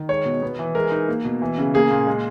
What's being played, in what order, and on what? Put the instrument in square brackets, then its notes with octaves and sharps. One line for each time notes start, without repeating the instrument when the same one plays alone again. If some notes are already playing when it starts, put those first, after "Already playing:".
Already playing: [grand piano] D#3
G#3 C#5
B2
B3
E3
G#3 A#4
D#4
A#3
B2
E3
C#3
A#3 G#4
A#2
G#3